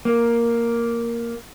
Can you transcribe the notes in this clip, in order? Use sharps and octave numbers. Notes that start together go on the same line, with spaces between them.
A#3